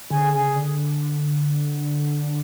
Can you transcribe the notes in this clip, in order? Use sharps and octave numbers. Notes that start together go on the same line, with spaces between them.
D3 G#4 G#5
C#3 G#4 G#5
C#3
D3